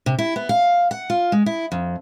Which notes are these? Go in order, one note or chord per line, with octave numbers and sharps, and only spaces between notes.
C3
E4
B3
F5
F#5
F4
G#3
E4
F2